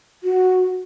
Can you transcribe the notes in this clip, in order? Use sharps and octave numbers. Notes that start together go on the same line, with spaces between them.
F#4